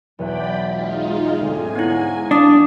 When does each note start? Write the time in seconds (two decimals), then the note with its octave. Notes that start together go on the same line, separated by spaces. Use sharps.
0.19 B1 E2 D5 G5 B5 F#6
0.62 G#3 D#4 F4
1.39 D2 G#2 C4 G#4 G#5
1.75 B3 E4 C#5 F#5
2.31 F#2 D4 F5 D6 D#6